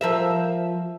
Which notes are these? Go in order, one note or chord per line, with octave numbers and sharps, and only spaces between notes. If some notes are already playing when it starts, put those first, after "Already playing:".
F3 A#4 E5